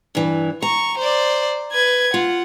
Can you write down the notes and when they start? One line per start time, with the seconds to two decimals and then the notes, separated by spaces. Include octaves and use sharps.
0.15 G2 E3
0.62 A#5 C#6
0.98 C5 D5
1.72 B4 G#6
2.14 F4 F#5